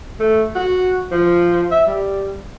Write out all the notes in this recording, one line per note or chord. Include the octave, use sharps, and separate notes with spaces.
A3
F#4
F3
E5
G3